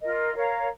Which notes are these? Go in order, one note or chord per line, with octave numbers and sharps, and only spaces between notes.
F4 A#4 D#5
A#4 C#5 F5 A#5